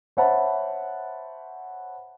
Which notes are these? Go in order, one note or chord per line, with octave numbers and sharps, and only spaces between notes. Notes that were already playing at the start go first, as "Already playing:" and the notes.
C5 C#5 E5 F#5 A5 B5